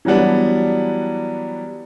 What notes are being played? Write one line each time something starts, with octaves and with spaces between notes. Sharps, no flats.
E3 F#3 G3 B3 D4